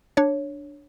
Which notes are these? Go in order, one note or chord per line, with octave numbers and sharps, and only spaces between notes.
D4 C#5